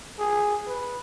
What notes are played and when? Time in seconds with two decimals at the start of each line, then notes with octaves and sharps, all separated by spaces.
0.19 G#4
0.67 B4